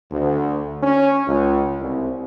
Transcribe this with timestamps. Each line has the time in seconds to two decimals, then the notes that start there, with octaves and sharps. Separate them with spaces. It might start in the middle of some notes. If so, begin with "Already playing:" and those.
0.12 D2
0.82 C#4
1.27 C#2
1.80 C2